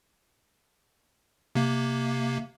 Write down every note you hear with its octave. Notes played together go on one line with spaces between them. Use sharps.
C3 A#3